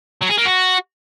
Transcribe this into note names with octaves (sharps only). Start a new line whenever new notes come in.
F#3
G#4
A#3
F#4